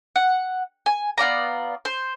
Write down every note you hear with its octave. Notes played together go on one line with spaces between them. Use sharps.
F#5
G#5
B3 F4 D5 A#5
C5